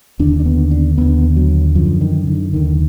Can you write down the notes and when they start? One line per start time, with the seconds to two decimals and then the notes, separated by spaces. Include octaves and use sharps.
0.19 D#2 D3 D4
0.40 D4
0.46 B3
0.71 D4
0.98 D#2 D3 B3
1.36 F#3
1.75 F#2 D3 F3
2.01 D#3
2.27 D3
2.53 D#2 D3 D#3